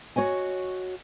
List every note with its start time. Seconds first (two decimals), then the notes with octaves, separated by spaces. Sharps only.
0.16 F#4 C#5 D#5 G#5